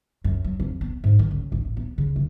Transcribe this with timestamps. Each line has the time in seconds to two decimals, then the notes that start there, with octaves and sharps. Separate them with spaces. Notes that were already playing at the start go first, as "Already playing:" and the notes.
0.24 F#2
0.44 F#3
0.60 F2
0.81 B3
1.04 G#2
1.19 D#3
1.31 C#2
1.52 A1
1.65 E3
1.77 B3
1.98 C#3
2.16 D2